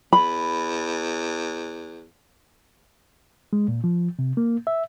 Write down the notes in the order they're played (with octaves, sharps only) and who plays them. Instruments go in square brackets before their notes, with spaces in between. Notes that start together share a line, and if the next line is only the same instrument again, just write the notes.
[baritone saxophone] E2 [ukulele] B5
[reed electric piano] G#3
A#2
F3
C3
A#3
E5